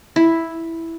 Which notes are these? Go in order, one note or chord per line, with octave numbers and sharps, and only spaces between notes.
E4